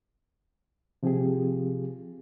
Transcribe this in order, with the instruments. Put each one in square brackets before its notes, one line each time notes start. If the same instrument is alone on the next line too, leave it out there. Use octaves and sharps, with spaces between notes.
[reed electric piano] C3 F3 C4 F4 G4 G#4